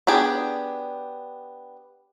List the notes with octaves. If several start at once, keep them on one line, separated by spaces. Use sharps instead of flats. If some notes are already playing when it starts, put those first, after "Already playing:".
B3 D4 G4 G#4